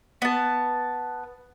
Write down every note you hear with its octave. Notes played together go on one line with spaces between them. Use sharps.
B3 A5